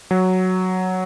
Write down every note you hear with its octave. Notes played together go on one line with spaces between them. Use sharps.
F#3